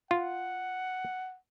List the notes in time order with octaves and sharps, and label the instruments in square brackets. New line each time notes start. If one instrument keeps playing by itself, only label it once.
[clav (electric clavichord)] F4 [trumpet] F#5